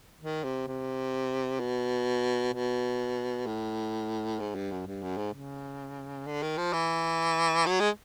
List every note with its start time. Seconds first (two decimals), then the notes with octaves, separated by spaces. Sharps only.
0.21 D#3
0.44 C3
0.67 C3
1.60 B2
2.53 B2
3.47 A2
4.40 G#2
4.55 G2
4.71 F#2
4.87 G2
5.02 F#2
5.18 G#2
5.33 C#3
6.26 D3
6.42 D#3
6.58 F3
6.73 E3
7.66 F#3
7.80 G#3